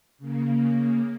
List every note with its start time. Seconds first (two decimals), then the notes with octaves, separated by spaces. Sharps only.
0.18 C#3 A#3